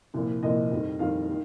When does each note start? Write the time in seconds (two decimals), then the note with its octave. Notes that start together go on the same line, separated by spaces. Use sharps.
0.14 C2 A#2 F3
0.43 C2 A#2 F3 D#5
0.71 F2 D#3 G3
0.99 F2 D#3 G3 F5
1.29 D#3